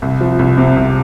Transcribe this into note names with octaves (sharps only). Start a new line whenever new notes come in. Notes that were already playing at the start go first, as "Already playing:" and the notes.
C2
F3
C2
C3
C2